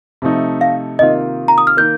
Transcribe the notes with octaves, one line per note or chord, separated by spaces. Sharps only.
C3 F3 A3 D#4
F5
C3 D#3 A#3 F4 D#5
A#5
D#6
F6
D#3 A#3 G6